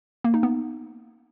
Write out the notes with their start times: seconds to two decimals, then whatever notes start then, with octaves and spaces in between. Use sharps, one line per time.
0.24 A#3
0.34 D#4
0.43 B3